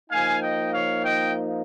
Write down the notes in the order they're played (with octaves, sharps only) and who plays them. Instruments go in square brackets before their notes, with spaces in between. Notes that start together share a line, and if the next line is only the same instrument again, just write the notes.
[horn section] F3 A#3 D#4 F5 G#5
D#5 G5
C#5 F5
D#5 G5